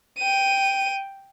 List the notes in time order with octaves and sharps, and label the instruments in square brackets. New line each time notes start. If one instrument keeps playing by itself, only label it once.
[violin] G5 D#7